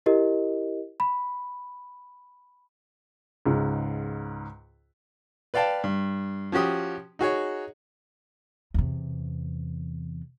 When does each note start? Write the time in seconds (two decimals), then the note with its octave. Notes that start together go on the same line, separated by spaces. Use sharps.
0.06 E4 G4 A#4 D#5
1.00 B5
3.46 C#2 G#2
5.54 B4 D5 F5 G5 A5
5.84 G2
6.52 F3 C#4 F#4 G4 D#6
7.19 D#4 F#4 G#4 C#5
8.74 E2 C3